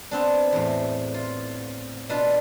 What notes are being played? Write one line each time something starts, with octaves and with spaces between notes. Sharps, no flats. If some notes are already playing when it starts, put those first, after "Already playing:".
B3 C4 D4
E2 A2
F4
B2 D4 F4 B4